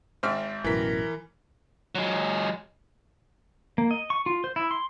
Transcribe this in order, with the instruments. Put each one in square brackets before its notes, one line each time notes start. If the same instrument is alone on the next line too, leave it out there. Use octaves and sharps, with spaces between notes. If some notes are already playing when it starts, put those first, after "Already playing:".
[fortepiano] G#1 G#2 F6 [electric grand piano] C5 E5
[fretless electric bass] A1 F#2 B2 [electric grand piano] E3 B6 [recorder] A#4
[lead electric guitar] F#3 G#3
[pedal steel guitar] A#3
D#5
C#6
F4
C5
E4
C6